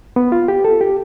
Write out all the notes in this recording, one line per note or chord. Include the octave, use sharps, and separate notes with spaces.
B3
F4
G4
A4
G4